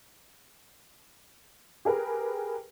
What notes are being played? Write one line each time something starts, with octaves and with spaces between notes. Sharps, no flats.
G4 G#4 A#4 B4